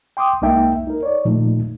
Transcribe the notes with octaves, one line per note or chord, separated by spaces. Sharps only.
G5 C6 D6 D#6
C2 G#3 A#3 D#4 E5 G5
D#4 A#4
C#5 D5
A#2 D#3 F3 A3 D#4